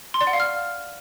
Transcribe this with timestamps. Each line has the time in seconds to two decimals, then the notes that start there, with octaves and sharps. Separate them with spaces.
0.14 C6
0.21 D5
0.27 F#5
0.33 F5
0.40 F6